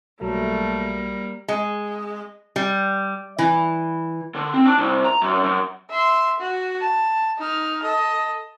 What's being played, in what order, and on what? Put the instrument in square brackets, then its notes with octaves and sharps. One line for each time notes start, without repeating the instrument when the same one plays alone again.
[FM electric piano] B1 F#3 A#5 [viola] G3 A#3 [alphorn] A3
[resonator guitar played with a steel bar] G#3
G3
E3
[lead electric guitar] D3
C4
D4
C2
A#5
F#2
F#2
[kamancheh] E5 C6
F#4
A5
D#4 F6
A4 D#5